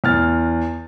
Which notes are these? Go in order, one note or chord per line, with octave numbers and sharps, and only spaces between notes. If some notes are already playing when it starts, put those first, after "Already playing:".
E2 F6 A6